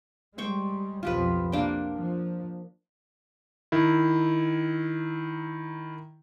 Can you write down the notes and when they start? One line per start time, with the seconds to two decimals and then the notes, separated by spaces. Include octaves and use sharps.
0.38 G3 G#3 C5 G5 C#6
1.03 B1 F2 F3 F4 G4 B4
1.52 C3 A#3 D4 G5
1.95 F3
3.72 D#3 E4